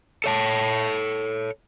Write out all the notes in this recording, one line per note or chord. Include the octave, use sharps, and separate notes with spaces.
A4 C#5 A5